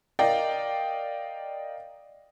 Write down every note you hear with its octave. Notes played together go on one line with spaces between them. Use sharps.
A#4 D5 D#5 F5 G5